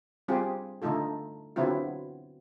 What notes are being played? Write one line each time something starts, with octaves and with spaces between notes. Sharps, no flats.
G3 C4 F4 G4 G#4
D3 A3 D#4 F4 A4
D3 F#3 B3 C4 E4 F4